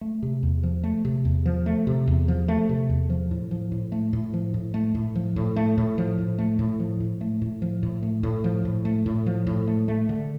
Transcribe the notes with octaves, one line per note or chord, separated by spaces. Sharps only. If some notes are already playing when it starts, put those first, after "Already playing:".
A3
C3
E2
F3
A3
C3
E2
F3
A3
C3
E2
F3
A3
C3
E2
F3
A2
F3
A2
A3
A2
F3
A2
A3
A2
F3
A2
A3
A2
F3
A2
A3
A2
F3
A2
A3
A2
F3
A2
A3
A2
F3
A2
A3
A2
F3
A2
A3
A3
D3